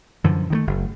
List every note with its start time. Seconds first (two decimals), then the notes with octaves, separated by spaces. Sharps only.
0.24 F#2 D3 E3 F3
0.50 D#3 G3 A3
0.67 F#1